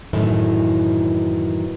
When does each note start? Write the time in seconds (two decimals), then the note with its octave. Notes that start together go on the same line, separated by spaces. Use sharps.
0.13 F#2 A2 D#3 E3